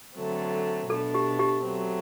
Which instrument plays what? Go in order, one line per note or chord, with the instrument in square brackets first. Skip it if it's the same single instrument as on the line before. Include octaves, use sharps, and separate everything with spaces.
[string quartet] D3 F#3 A3 C4
[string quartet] B2 A3 D4 [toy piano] A4
[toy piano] G4
G4
[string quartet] F#3 A3 C4